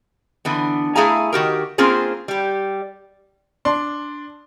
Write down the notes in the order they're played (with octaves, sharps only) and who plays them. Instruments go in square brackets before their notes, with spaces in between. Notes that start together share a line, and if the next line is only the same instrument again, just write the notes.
[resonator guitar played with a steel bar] D3 E3 B3
A3 E4 G#4 F5 G#5 A#5
D#3 F#4 G4 A#4
A#3 C4 C#4 F4 G#4 C5
G3 G4
[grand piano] D4 C6